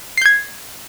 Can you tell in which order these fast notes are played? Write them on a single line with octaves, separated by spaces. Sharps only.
C7 G6 G#6